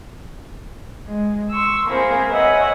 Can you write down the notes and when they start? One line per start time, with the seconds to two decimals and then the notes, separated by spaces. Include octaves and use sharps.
1.06 G#3
1.51 C6 C#6 E6
1.87 A#3 C4 E4 G#4 A#4 C5
2.29 B4 C#5 D#5 E5 F#5 G#5